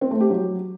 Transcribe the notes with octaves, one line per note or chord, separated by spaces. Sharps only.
C4
A3
G4
F#3